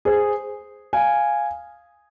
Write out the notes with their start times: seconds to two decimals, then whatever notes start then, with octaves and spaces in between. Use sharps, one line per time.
0.05 G#4 C5
0.93 F5 G#5